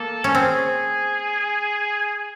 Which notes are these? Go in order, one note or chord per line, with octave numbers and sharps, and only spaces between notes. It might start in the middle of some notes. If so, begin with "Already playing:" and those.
Already playing: A#3 A4
C#4
C4 G#4